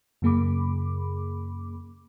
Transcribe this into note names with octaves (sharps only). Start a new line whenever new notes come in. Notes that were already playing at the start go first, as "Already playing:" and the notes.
F#2 C#3 A#3 G#4 B5 D6